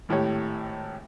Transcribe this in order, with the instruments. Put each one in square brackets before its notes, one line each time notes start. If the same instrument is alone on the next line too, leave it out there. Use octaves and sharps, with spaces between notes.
[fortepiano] G#1 A2 G4 C#5